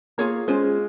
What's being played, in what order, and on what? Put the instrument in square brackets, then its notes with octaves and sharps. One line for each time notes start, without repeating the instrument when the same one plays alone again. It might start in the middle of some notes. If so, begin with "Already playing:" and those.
[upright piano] A#3 [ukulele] F4 G#4 C#5 F5
[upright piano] G#3 [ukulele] C#4 F4 C5